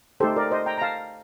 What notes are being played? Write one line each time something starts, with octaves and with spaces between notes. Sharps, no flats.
A3 D#4 G4 A4 C5
A#4 D5
C5 D#5
G5 A#5
A#5
F5 A5